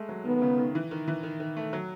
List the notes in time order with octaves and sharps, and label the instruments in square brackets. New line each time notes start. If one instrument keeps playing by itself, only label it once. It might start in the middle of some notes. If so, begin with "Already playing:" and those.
Already playing: [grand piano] G#3 A3
F#3
[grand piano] D#3 [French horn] B3
[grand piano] C#3
D#3
E3
D#3
E3
D#3
D#3
A3
F#3